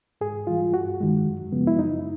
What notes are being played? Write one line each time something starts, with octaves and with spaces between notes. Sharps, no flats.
G#2 G#4
E3 G3 F4
G2 F#4
D#3 G#3
F#2
C#3 F3 G#3 B3
E4
F#2 D#4